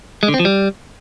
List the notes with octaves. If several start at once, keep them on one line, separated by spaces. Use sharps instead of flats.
G#3
D3
C4
F3
G3